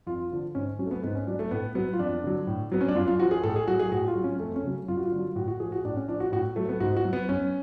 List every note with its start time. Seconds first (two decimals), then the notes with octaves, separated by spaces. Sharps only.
0.07 F2 F4
0.31 D3 F3
0.55 G#2 C#4
0.79 F#3 C#4
0.86 A3
0.91 B3
1.03 G#2 B3
1.15 C#4
1.27 F#3 D4
1.39 A3
1.51 A2 B3
1.75 F#3 B3
1.93 F4
1.99 F2 D4
2.24 D3 F#3
2.47 A2
2.72 F#3 B3
2.81 C#4
2.88 D4
2.95 F#2 F4
3.07 F4
3.19 F3 F#4
3.31 G#4
3.44 A2 A4
3.56 G#4
3.68 F#3 F#4
3.79 G#4
3.92 A2 F#4
4.07 F4
4.15 F#3
4.24 C#4
4.40 F2 A3
4.56 C#4
4.64 C#3 F#3
4.88 F#2 F4
4.97 F#4
5.05 F4
5.12 D3 F#3
5.36 A2 F#4
5.48 F#4
5.60 F3 G#4
5.72 F#4
5.84 A2 D4
5.96 C#4
6.08 F3 D4
6.20 F#4
6.32 A2 F#4
6.56 F#3 A3
6.69 B3
6.80 G#2 F#4
6.96 F#4
7.05 F#3
7.13 B3
7.28 F#2 C#4